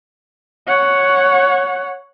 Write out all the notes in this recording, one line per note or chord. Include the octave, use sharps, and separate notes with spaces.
C#5 F#5